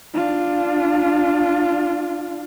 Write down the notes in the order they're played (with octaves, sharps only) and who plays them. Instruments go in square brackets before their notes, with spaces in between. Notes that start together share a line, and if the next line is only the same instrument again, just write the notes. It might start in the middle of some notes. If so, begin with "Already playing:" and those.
[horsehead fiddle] D4 F4